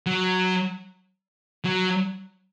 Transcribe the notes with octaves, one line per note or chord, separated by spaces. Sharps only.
F#3
F#3